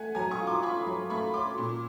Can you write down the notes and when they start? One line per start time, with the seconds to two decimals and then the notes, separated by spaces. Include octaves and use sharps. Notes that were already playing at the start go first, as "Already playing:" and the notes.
Already playing: A3 F#5 G#5
0.15 F#3 G#5 A#5
0.31 C#6 D#6
0.40 F4
0.47 C6 D6
0.62 F4 B5 C#6
0.87 F#3
1.10 A3 B5 C#6
1.34 C#4 C6 D6
1.58 A#2